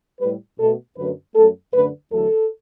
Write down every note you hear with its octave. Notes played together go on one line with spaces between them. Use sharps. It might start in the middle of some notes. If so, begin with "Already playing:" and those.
A2 G3 B4
B2 A3 A4
F#2 D3 F#3 A3 B4
F#2 F#3 A3 A4
F#2 D3 A3 B4
E2 D3 F#3 A3 A4